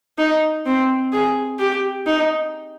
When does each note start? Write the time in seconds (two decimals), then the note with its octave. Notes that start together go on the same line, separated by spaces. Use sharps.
0.18 D#4
0.66 C4
1.13 G#4
1.59 G4
2.07 D#4